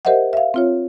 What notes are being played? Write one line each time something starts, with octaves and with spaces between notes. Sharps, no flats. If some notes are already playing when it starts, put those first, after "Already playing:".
G4 A#4 C5 D#5 E5 F#5
E5 F5
C4 F4 C#5